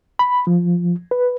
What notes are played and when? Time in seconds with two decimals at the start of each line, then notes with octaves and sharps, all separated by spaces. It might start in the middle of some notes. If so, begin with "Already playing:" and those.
0.19 B5
0.47 F3
1.11 B4